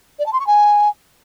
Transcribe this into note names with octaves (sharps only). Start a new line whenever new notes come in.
D5
A5
C6
C#6
G#5